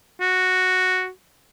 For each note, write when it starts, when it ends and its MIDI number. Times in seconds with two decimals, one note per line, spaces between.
0.20 1.09 66